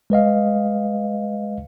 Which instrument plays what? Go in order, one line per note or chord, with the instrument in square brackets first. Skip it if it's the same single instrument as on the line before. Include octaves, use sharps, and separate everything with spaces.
[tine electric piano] G#3 B4 D#5 F5